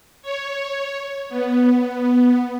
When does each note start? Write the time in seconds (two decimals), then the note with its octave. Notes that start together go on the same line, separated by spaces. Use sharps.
0.22 C#5
1.29 B3